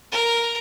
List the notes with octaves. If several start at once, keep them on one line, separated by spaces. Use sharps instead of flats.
A#4